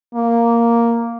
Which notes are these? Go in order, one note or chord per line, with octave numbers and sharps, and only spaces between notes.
A#3